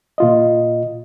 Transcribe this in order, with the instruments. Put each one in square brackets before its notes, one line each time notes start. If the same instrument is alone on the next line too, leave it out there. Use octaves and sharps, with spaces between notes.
[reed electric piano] A#2 F4 D#5